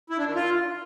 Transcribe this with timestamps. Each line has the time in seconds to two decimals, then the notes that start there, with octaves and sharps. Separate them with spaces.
0.10 E4
0.18 D4
0.27 D#3
0.35 F4